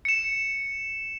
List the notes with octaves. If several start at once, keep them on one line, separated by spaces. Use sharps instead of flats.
C#7 E7